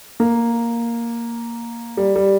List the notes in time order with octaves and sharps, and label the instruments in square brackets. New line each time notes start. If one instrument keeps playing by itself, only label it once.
[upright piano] A#3
G3
G3